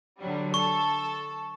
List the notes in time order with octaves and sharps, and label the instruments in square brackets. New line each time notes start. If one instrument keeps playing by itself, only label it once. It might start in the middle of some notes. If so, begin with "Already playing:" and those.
[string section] D3 F#3 G3
[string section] A4 [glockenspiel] C#6